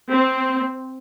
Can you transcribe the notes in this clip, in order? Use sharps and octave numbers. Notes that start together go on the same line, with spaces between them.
C4